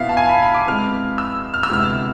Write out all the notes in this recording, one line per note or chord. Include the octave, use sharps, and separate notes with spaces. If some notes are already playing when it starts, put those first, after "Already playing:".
Already playing: B2 B3 E4 E5 F5
A5
G#5
B5
B5
D6
B2 G#3 C4 E4 F6
E6
F6
E6
D2 C3 G#3 B3 E4 F6